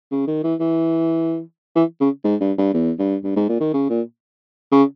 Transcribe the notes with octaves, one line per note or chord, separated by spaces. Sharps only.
C#3
D#3
E3
E3
E3
C#3
G#2
G2
G2
E2
G2
G2
G#2
A#2
D#3
C#3
A#2
C#3